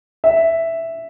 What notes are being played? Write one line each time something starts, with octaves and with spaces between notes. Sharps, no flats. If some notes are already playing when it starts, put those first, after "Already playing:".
E5